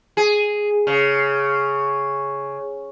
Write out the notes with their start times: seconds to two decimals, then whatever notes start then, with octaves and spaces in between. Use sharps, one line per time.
0.17 G#4
0.87 C#3